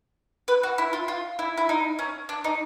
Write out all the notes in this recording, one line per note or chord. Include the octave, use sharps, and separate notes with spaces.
B4
F#4
E4
F4
F4
E4
E4
D#4
C#4
D4
D#4